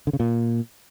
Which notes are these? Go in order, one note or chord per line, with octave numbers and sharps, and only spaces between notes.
D3
C#3
A#2